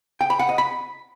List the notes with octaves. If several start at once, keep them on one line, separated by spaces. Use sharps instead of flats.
G5
B5
F#5
D#5
B5